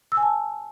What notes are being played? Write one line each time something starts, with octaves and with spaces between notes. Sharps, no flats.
E6
G#5
A5